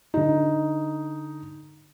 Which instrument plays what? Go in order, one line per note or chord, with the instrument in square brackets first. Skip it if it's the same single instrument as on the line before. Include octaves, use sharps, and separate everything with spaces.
[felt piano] D3 D#4